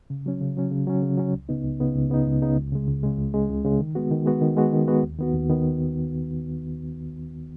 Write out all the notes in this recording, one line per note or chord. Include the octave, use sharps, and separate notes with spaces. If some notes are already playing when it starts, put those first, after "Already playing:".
C#3
F#3 C#4
C#3
F#3 C#4
C#3
F#3 C#4
C#3
F#3 C#4
C#2
C#3 B3 D#4
C#2
C#3 B3 D#4
C#2
C#3 B3 D#4
C#2
C#3 B3 D#4
C#2
C#3 G#3
C#2
C#3 G#3
C#2
C#3 G#3
C#2
C#3 G#3
D#3
G#3 B3 F#4
D#3
G#3 B3 F#4
D#3
G#3 B3 F#4
D#3
G#3 B3 F#4
D#2
D#3 B3 F#4
D#2
D#3 B3